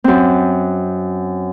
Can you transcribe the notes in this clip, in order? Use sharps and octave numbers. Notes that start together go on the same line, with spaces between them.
F#2 C4